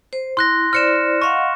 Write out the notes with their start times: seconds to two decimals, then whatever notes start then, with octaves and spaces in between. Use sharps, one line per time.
0.13 C5
0.37 E4 C6 F#6 A#6
0.73 E4 C5 D5 F6 C#7 E7
1.22 D#5 F5 F#5 C#6